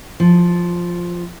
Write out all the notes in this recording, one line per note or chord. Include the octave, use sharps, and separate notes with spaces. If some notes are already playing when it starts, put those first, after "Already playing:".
F3